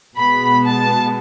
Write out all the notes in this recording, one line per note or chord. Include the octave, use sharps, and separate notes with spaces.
B2 G#3 B3 B5
A5